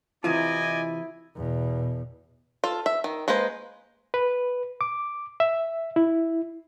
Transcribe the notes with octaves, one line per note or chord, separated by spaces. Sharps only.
C3 E3 E4 F4 D5 D#5 G#5
E2 B2
F4 A4
E5
D#3
G#3 A#3 B4 C5
B4
D6
E5
E4